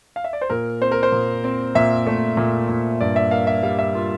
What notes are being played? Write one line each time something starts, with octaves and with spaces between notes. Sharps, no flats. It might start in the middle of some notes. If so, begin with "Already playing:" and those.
F5
E5
D5
C5
A#2 A#4
C4 C5
A#4
C5
A#2
C4
A#2 E5
A3
A#2
A#2
G2 D5
E5
A#3 F5
E5
G3 F5
E5
A#3 F4